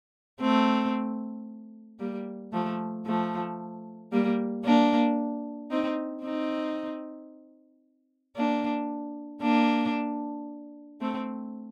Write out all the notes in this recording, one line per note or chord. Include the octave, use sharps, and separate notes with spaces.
A3 C4
G3 A#3
F3 A3
F3 A3
G3 A#3
A#3 D4
C4 D#4
C4 D#4
A#3 D4
A#3 D4
A3 C4